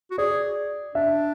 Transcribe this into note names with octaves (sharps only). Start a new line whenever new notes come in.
F#4
G#4 D5
D4 E5